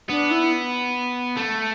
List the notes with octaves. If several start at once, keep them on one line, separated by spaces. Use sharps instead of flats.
B3 D4
E4
A3